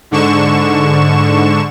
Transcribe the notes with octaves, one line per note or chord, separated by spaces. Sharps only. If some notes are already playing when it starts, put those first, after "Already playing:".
G#2 D3 C#6 E7